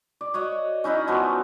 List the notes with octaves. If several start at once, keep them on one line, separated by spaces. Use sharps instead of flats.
D5
F#4 C#5 D#5 F#5
C#4 D#4 E4 F#5
F3 F#3 B3 F#4